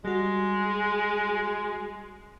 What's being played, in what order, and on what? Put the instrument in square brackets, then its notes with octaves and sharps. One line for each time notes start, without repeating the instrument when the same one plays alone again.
[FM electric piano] G3 F#4 [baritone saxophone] G#3